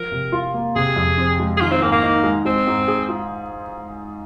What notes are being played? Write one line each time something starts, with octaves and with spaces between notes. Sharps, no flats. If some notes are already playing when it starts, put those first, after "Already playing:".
Already playing: F3 A#4
C3
F4
A#3
C3 G#4
F2
C4
G#3
G#4
D#3 F4
C4
G#2 A#3
A#3
D#4
G#3
G#3 C4
G#2
G#4
F4